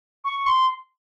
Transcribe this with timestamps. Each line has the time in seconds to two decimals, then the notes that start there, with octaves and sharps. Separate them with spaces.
0.24 C#6
0.46 C6